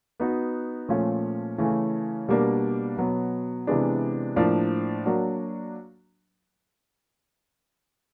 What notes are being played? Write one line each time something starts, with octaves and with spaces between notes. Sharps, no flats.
B3 D#4 F#4
A#2 F3 A3 C#4 F4
C#3 E3 A3 C#4
B2 G3 A#3 D4
B2 F#3 B3
C3 E3 G#3 B3 D4
A2 F3 A#3 D4
F#3 A#3 D4 F#4